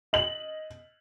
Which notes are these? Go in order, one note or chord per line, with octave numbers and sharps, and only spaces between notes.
D#5 F#7